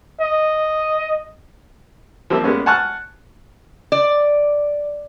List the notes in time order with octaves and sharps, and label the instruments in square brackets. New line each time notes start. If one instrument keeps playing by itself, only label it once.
[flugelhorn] D#5
[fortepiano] F3 G3 A#3 C4 E5
G3 G#3 A#3 B3 C#4
F#5 G#5 A5 C#6 F6 F#6
[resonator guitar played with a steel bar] D5